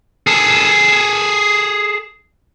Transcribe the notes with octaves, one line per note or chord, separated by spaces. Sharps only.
G#4 A4